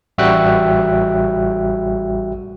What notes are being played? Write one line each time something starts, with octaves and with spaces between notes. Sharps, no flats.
A1 G3 F#4 E5 G5 F#6